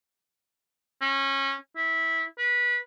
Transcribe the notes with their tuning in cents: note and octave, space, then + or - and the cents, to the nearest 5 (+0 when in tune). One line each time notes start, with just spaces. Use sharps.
C#4 -25
E4 -15
B4 -25